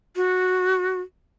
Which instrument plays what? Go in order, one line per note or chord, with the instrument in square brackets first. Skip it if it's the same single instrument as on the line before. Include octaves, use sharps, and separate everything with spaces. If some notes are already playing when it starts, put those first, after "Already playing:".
[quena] F#4